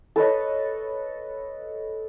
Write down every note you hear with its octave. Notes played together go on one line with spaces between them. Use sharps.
A4 B4 C#5 D#5